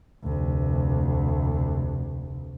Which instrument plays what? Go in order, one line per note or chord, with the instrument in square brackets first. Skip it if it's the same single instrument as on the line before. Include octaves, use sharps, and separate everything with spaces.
[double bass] F1 D2